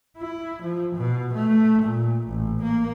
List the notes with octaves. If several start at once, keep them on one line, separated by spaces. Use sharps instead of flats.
E4
F3
B2
A3
A#2
A1
A#3